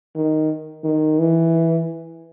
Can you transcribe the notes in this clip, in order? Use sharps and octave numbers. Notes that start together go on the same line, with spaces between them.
D#3
D#3
E3